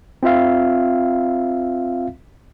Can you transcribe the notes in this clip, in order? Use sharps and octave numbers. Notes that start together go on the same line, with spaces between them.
C4 F4 E5 F5